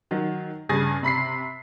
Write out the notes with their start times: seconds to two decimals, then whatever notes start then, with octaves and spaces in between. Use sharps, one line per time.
0.11 D#3 F#3
0.69 G2 C#3 G#4 G#5 A6 A#6
1.03 C3 B5 B6 C7